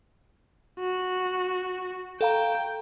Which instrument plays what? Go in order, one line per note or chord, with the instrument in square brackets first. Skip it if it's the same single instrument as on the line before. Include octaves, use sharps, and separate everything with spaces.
[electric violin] F#4
[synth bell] A4 F5 A#5 [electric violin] G5